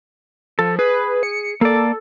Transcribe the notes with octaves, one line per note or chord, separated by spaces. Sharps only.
F3 A4
G#4 B4
C#7
A#3 A4 D5